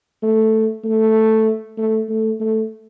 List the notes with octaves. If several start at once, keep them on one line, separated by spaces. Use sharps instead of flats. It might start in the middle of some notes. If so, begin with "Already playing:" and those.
A3
A3
A3
A3
A3